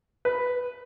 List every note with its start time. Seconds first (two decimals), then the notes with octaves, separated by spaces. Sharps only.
0.25 B4